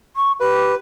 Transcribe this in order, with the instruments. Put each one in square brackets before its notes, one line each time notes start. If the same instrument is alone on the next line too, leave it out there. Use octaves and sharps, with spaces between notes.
[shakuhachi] C#6
[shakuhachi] G4 [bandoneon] B4